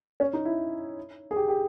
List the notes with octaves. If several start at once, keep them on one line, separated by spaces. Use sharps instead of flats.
C#4
D#4
E4
G#4
G4
G4